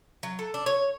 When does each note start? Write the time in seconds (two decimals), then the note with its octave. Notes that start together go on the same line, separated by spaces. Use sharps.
0.23 F#3
0.39 A4
0.54 D4
0.66 C#5